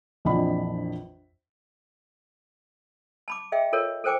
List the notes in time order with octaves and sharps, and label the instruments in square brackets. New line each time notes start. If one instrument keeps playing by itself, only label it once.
[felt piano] A#1 F2 E3 D4 D#5 B5
[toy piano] A5 B5 D6
G#4 D#5 E5 G5
F4 A4 A#4 C#5
A4 A#4 C5 G5 G#5 D6